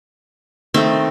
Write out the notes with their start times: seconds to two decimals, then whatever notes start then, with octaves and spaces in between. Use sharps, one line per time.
0.74 D#3 A3 C4